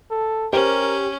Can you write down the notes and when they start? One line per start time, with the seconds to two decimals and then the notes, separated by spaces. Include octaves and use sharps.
0.11 A4
0.53 C#4 G4 A#4 C5